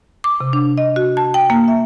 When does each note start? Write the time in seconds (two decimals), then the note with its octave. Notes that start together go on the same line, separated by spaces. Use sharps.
0.24 D6
0.40 C3
0.53 D4
0.78 D#5
0.96 F#4
1.17 A5
1.34 G5
1.50 A#3
1.68 E5